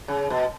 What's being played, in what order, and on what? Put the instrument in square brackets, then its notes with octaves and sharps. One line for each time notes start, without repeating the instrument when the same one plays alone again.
[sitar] C#3
B2